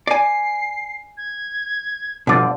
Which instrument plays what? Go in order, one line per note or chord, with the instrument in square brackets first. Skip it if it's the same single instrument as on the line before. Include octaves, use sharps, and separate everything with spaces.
[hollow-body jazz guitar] D5 G#5 [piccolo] C7
[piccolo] G#6
[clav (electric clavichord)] G1 D3 D5 [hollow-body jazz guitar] B2 F3